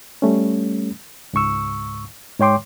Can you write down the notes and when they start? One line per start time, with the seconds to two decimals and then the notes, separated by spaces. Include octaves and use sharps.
0.22 G3 A3 C#4
1.33 C#2 G#2 C#6 E6
2.39 G#2 G#3 C#5 G5 C6 D6